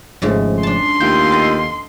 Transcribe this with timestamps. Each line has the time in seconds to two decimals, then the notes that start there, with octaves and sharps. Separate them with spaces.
0.22 G#1 F2 G#2 C#3 F3 A3
0.63 D4 A5 C6
1.01 D#2 A3 F4 G5 G6
1.31 A4 D#5 F5